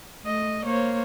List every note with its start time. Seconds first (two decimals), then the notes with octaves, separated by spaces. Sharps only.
0.23 A3 D#5
0.65 A#3 C5 C#5